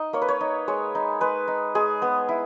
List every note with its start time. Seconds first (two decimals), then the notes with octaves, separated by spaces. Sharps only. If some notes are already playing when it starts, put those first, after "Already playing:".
Already playing: D#4 D#5
0.13 A#3 C#5
0.22 B4
0.28 C#5
0.41 D#4
0.68 G#3 C#5
0.95 D#4
1.21 G#3 B4
1.48 D#4
1.75 G#3 G#4
2.02 B3
2.29 E4